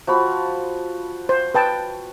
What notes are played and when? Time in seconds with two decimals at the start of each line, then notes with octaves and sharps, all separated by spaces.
0.07 F3 F#4 B5
1.29 C5
1.55 B4 G5 A5